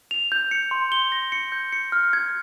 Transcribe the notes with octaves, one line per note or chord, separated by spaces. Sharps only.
F7
G6
C#7
C6
G7
A#6
C#7
G6
C#7
F6
G#6